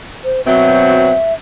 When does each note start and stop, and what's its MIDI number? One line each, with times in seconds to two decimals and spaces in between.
0.25 0.41 72
0.46 1.14 47
0.46 1.14 54
0.46 1.14 60
0.46 1.33 76